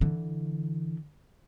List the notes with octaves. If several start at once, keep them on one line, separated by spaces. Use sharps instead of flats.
D3 E3